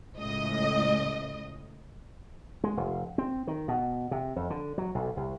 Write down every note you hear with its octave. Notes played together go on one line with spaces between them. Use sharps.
C#2 A2 D#5
G#3
F1
C4
D#3
B2
C3
F2
D3
F#3
B1
C2